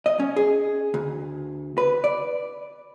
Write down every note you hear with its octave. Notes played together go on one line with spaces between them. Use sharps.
D#5
C#4
G#4
D2
B4
D5